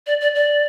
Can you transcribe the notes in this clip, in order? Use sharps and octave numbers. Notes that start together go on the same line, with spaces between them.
D5
D5
D5